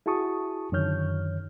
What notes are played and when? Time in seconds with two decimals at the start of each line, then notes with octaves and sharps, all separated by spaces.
0.06 E4 F#4 G#4 A5 C#6 D#6
0.72 F#2 D3 D#3 C#5 F6 G6